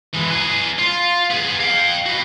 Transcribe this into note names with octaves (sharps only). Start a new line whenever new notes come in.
E3 G#3
G#4 B4
F4
B3 G#4
F5 G5
F#4 B4